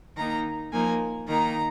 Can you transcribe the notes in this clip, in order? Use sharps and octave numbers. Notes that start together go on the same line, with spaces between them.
D#3 A#3 D#4 A#5
F3 A#3 D#4 G#5
D#3 A#3 D#4 A#5